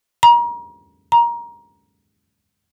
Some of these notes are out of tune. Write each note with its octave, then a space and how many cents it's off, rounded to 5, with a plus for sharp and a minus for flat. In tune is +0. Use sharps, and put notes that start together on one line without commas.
A#5 +35
A#5 +20